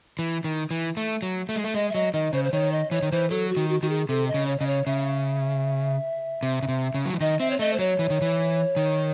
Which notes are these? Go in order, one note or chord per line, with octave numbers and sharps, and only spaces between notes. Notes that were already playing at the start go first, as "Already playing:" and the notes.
E3
D#3
E3
A3
F#3
A3
G#3
A3
G#3 D#5
E5
F#3 D#5
D#3 D#5
C#3 C5
C5
D#3 C#5
D#5
E3 C#5
D#3
E3 C5
F#3 A4
F#4
D#3
F#4
D#3 F#4
G#4
C3 A4
D#5
C#3
C#5
C#3 D#5
C#5
C#3 E5
C3
C#3
C3
C#3
F#3
E3
D#3 D#5
C4 E5
C#5
A3 D#5
C5
F#3 C#5
E3
D#3
E3
D#3